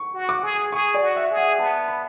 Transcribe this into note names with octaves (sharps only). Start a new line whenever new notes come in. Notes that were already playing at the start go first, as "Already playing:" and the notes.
Already playing: C#6
F#4
D6
G#4
G#4 C#6
D5
F#4
E5
G#4
F#5
B3 A5
B5